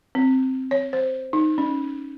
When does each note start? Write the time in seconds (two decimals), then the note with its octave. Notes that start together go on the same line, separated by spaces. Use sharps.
0.15 C4
0.71 C#5
0.93 C5
1.33 D#4
1.58 C#4